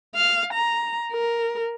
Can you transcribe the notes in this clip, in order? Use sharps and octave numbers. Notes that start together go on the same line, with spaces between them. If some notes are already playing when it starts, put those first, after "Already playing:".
F5
A#5
A#4